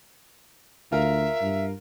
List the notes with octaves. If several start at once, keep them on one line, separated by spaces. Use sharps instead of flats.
D2 F4 A#4 E5 F5
G2